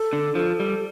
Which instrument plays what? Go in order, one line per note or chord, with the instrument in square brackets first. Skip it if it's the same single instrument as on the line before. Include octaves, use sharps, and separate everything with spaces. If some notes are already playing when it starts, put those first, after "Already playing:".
Already playing: [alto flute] A4
[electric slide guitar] D3
[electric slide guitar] F3 [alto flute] A4
[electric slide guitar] G3